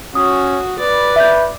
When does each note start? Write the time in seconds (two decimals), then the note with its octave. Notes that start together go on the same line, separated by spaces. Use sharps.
0.15 C#4 F#4 D#6
0.79 B4 D5
1.16 E5 G6